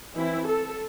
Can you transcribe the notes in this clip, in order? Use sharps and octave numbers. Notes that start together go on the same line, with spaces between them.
E3 C4 E4
A4